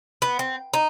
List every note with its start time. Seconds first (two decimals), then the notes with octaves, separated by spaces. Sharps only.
0.22 B3
0.39 C4
0.74 D#4